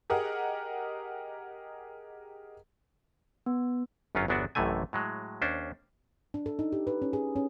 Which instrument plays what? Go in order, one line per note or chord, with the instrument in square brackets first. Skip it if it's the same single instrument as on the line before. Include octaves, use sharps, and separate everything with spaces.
[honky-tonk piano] G4 G#4 A#4 D#5 F#5
[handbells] B3
[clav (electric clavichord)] G1 F#2 F#3 C#4 F4
G1 E2 F#3 B3 D4 F#4
A1 F#2 A2 C3 A3 G#5
A2 F#3 G#3
D#2 C#4 D4 C5
[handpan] D4
A4
D#4
G4
B4
C#4
G#4
C#4